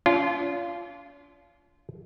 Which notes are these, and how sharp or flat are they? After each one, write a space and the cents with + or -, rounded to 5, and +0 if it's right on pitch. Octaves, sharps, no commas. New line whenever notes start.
D4 -45 F4 -15